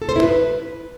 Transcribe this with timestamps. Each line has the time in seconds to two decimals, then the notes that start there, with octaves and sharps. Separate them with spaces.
0.02 A4
0.09 C5
0.16 E4
0.23 B4